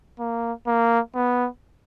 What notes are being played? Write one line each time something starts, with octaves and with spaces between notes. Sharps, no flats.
A#3
A#3
B3